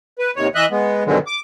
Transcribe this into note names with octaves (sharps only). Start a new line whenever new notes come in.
B4
D#2 C3 D#3 C#5
E3 D#5 E5 F#6
G#3 B3
G2 B2 D3 D#3 F#3 G#3
D6